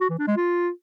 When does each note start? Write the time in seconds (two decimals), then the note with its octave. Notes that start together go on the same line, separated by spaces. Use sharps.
0.01 F#4
0.10 E3
0.19 D4
0.28 G#3
0.37 F4